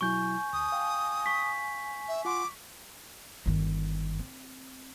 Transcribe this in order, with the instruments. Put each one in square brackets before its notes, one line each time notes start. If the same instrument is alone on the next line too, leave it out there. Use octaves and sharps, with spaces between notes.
[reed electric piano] B2 F#3 E4 [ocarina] G#5 [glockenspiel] C#6 G6
[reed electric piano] D2 [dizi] D#6
[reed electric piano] F5 G5
[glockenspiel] C#6 B6
[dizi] E5
[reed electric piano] F4 F#5 C6 [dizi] D6
[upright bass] G1 D#3
C4